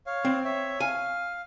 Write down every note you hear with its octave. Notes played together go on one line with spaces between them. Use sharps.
C#5 F5
C4
C#5 E5
F5 G#5